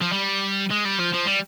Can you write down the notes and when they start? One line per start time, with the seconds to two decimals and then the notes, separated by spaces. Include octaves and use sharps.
0.02 F3
0.12 G3
0.71 G#3
0.85 G3
1.00 F3
1.14 F3
1.27 G3